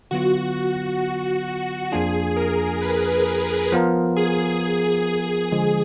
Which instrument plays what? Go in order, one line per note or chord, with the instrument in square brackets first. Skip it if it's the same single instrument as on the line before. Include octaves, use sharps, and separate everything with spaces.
[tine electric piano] D3 F#3 B3 F4 [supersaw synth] F#4
[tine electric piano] F2 F3 A#3 D4 F4 [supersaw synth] G#4
[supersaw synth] A#4
B4
[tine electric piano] F3 B3 F4 A#4
[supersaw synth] G#4
[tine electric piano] D3 F3 G#3 [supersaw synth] G#4